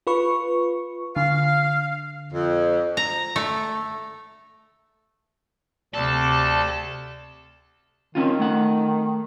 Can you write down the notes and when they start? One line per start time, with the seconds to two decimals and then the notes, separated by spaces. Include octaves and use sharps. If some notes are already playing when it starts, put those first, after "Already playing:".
0.07 F4 B4 C#6
1.16 D3 F5
2.33 F2
2.97 A#5
3.36 A3
5.94 D2 C3 A4 D5 A5
8.15 D#3 C4 C#4 F4
8.40 A3 F#5